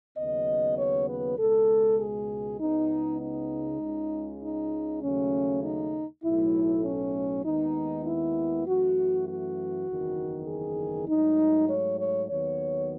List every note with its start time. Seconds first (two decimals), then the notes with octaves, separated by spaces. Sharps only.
0.18 D#2 C#3 F#3 B3 D#5
0.78 C#5
1.08 B4
1.39 C#2 B2 G#3 A4
1.99 G#4
2.60 C#2 C#3 G#3 B3 D#4
3.21 D#4
3.81 C#2 C#3 G#3
4.42 D#4
5.02 D#2 C#3 F#3 A3 C#4
5.63 D#4
6.24 B1 A2 F#3 A3 E4
6.84 C#4
7.45 D#2 D#3 G#3 B3 D#4
8.06 E4
8.66 F#2 E3 A3 F#4
9.27 F#4
9.87 F#1 E2 D#3
10.48 G#4
11.09 G#2 F#3 A3 D#4
11.69 C#5
12.00 C#5
12.30 D#2 D#3 F#3 B3 C#5